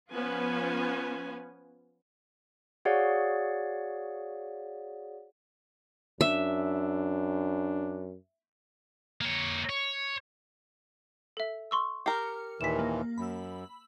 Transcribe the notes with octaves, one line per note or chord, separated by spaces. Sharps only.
F3 B3 C#4 F4 B4 G#5
F#4 G#4 C#5 D5 F5 F#5
F#2 D4 E5
A#3 C#5
C#5
A4 E5
C6 C#6 E6
G4 A#4 F6 C7 C#7
D#2 A#2 E3 B6 E7
A#3
F#2 B5 E6